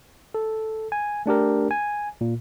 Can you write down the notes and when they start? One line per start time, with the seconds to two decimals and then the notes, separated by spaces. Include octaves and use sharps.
0.34 A4
0.92 G#5
1.26 A3 D4 G4 A#4
1.71 G#5
2.21 A#2